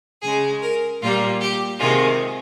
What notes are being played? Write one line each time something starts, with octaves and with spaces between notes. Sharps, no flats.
C#3 G#3 G#4
A#4
A#2 G3 A#3 F4
G4
C3 D#3 G#3 F4